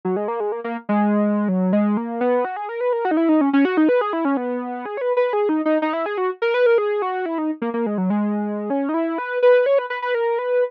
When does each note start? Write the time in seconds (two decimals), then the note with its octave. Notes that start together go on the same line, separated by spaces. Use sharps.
0.05 F#3
0.16 G#3
0.28 A#3
0.40 G#3
0.52 A#3
0.64 A#3
0.89 G#3
1.49 F#3
1.73 G#3
1.97 A#3
2.21 B3
2.45 F#4
2.56 G#4
2.69 A#4
2.81 B4
2.93 A#4
3.05 F#4
3.11 D#4
3.17 E4
3.29 D#4
3.41 C#4
3.53 C#4
3.65 F#4
3.77 D#4
3.89 B4
4.01 G#4
4.13 E4
4.25 C#4
4.37 B3
4.85 G#4
4.97 C#5
5.01 B4
5.17 B4
5.33 G#4
5.49 D#4
5.65 D#4
5.82 D#4
5.93 E4
6.06 G#4
6.18 F#4
6.42 A#4
6.54 B4
6.66 A#4
6.78 G#4
7.02 F#4
7.26 E4
7.38 D#4
7.62 A#3
7.74 A#3
7.86 G#3
7.98 F#3
8.10 G#3
8.70 C#4
8.89 D#4
8.94 E4
9.18 B4
9.43 B4
9.66 C#5
9.78 B4
9.90 B4
10.02 B4
10.15 A#4
10.39 B4